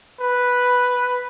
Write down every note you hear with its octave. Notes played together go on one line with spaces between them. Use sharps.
B4